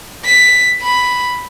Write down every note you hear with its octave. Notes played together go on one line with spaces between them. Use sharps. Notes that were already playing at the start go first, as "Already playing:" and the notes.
B6
B5